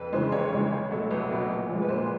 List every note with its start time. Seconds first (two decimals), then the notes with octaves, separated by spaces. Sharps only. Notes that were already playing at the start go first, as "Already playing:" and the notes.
Already playing: F2 B4
0.12 C#3 E3 G#3 C5
0.32 F2 C#5
0.52 C#3 E3 G#3
0.71 C2
0.91 B2 F#3 A3
1.11 C2 B4
1.31 B2 F#3 A3
1.50 A#2
1.69 F3 G#3
1.82 B4
1.89 A#2 C5